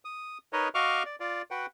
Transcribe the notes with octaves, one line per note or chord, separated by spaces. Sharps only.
D#6
D#4 A#4 B4 C#5 D#5
F#4 D#5 F5 C#6 D6 F6
D5
F4 D5
F#4 B4 F#5 G5